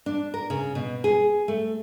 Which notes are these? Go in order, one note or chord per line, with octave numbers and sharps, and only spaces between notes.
D4
A#4
C#3
B2
G#4
A3